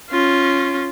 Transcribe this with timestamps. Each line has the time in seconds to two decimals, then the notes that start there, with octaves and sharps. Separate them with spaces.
0.10 C#4 F4